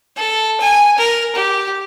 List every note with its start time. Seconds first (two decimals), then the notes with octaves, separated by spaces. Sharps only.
0.16 A4
0.61 G#5
0.98 A#4
1.36 G4